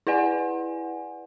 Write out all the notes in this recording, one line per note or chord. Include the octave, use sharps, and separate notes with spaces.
E4 B4 D5 F#5 G#5